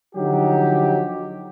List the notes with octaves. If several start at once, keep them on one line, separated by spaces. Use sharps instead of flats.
D3 F3 F#3 D#4 F#4 G4